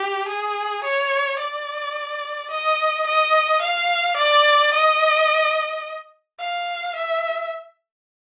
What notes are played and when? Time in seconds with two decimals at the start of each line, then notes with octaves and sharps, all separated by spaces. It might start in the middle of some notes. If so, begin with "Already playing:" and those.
Already playing: G4
0.28 G#4
0.84 C#5
1.39 D5
2.51 D#5
3.07 D#5
3.62 F5
4.17 D5
4.74 D#5
6.39 F5
6.96 E5